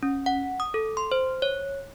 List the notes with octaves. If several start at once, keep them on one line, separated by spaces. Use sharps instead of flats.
C#4
F#5
D#6
A4
C6
C5
C#5